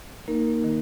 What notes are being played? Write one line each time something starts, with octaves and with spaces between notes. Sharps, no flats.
A#3 D#4 A#4
D#3